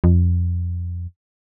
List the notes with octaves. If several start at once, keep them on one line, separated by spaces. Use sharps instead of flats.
F2